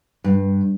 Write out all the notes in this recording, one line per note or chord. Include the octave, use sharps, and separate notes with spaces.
G2